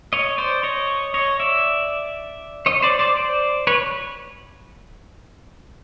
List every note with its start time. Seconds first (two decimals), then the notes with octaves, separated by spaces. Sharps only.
0.13 C#5 D#5
0.38 C5 D5
0.63 C#5 D#5
1.14 C#5 D#5
1.40 D5 E5
2.66 C#5 D#5
2.82 C5 D5
2.99 C5 D5
3.16 C5 D5
3.67 B4 C#5